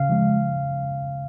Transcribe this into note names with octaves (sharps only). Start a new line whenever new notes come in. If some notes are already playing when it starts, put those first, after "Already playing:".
Already playing: C#3 F5
F3 G#3
C#3